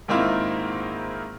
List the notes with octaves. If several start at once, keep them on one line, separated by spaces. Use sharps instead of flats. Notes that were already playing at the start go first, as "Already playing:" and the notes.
G#2 D#3 A#3 C4 E4 F4